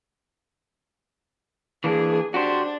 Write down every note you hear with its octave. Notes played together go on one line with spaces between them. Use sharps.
E3 A#3 D4 G#4
D4 F#4 G4 C5